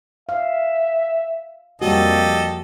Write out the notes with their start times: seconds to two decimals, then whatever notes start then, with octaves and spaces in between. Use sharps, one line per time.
0.29 E5 F5
1.82 F2 G3 A#3 F#4 G4 A4 D#5